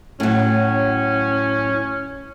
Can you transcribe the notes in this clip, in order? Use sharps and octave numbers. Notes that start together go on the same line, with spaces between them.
A2 F#3 C#4